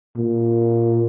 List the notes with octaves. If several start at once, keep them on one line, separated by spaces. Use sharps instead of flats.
A#2